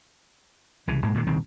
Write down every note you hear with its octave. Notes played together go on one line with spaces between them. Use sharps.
C2 C#3 E3
B1 G#2 G#3 A#3
A#2 D#3 F3 G#3
D#1 C2 D#3 C4